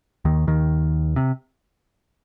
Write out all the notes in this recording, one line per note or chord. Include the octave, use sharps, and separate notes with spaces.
D#2 D#3
D#2 D#3
C3